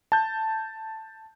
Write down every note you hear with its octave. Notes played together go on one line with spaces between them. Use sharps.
A5 G6